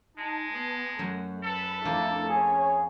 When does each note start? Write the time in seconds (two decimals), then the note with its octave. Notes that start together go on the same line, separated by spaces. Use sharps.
0.18 G#3 D#4 A5
0.51 B3 A5
0.99 F#2 F#3 A3 F#5
1.44 A4 B4 B5
1.85 F2 A3 A#3 D4 E4 F4
2.29 C#4 G#4 C#5